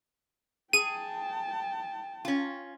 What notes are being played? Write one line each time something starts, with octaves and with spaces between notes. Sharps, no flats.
G#4 G5 A5 D#7
C#4 F4